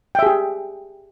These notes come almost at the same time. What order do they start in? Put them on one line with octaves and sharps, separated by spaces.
G5 E5 G#4 G4